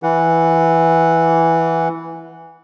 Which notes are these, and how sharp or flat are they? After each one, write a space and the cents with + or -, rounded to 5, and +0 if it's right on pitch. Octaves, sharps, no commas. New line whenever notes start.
E3 +0 F#5 +0